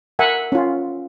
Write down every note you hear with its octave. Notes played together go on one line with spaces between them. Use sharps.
A#4 E5 F#5 G#5
C#4 F4